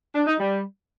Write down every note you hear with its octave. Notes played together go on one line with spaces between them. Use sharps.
D4
D#4
G3